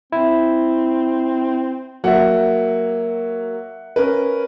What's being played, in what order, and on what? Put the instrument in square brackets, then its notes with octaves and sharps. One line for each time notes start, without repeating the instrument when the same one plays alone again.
[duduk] C4 [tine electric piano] E4
[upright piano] F#3 A#3 [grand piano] E5 F#5
[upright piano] C#4 A#4 B4